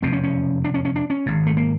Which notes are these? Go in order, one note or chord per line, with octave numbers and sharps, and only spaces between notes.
F1 E2 B2 C4
C#4
C#4
D4
C#4
C#4
D4
C#4
G#1 G#2
A3
A#3